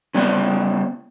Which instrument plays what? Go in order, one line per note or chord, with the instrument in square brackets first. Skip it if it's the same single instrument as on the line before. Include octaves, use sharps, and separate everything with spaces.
[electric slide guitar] C#3 G3 B3 D5 G5